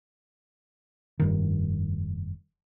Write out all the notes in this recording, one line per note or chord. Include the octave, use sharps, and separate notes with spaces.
F1 G2 D#3